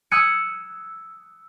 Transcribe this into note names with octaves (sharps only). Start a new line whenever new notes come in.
D#6 E6 F#6 G#6 C#7 D#7